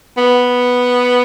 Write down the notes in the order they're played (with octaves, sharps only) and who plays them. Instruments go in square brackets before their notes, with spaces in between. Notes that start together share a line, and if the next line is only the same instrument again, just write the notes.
[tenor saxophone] B3